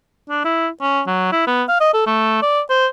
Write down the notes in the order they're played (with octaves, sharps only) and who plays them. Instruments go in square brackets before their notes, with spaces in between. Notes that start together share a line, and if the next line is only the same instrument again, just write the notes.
[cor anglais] D4
E4
C#4
F#3
E4
B3
F5
D#5
A4
A3
D5
C5